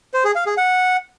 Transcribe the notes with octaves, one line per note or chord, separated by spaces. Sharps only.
C5
G#4
F5
G#4
F#5